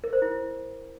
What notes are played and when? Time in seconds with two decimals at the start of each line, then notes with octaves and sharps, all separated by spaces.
0.04 A#4
0.13 C5
0.22 E4